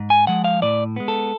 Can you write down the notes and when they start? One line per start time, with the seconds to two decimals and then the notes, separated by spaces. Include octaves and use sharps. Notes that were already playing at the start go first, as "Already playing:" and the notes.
Already playing: G#2
0.10 G#5
0.27 F3 G#3 F#5
0.44 F5
0.62 A2 D5
0.96 G#3 B3
1.08 A4